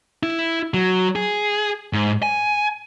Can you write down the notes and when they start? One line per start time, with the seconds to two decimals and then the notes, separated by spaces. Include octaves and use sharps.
0.23 E4
0.74 F#3
1.16 G#4
1.93 G#2
2.23 G#5